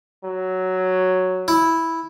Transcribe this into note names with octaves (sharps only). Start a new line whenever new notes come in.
F#3
E4